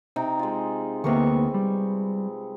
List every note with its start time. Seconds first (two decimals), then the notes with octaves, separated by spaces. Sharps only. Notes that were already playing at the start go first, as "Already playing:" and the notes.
0.16 C3 D#4 G5
0.39 G#3 F4
1.04 D2 C3 A#3 B3 B4 C#6
1.54 G3